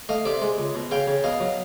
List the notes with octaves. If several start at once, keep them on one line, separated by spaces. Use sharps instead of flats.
A3 D#5 F5
C3 D5 E5
G#3
C#2
B2
C#3 F5 G5
C#3
B2 D#5 F5
F#3